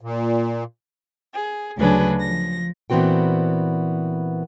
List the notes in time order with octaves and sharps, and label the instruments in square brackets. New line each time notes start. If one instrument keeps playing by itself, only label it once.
[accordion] A#2
[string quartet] G#4
D2 C#3 F#3 D4 G#4 B4
F3 A#6
[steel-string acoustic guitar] A#2 E3 B3 C4 F#4 G5